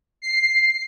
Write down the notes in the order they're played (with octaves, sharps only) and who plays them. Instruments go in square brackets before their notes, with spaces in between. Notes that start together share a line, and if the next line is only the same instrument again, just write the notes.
[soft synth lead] C7